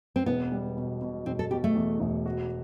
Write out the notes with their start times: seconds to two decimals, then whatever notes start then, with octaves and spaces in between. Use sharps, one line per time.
0.16 C4
0.26 E1 B3
0.52 G3
0.77 B2
1.01 B2
1.26 E1 C4
1.39 A4
1.51 B2 G4
1.64 A3
1.75 E2
2.00 E1
2.26 F#4